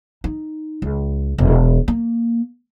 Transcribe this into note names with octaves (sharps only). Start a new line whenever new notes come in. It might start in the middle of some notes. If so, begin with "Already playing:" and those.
D#4
C#2
E1
A#3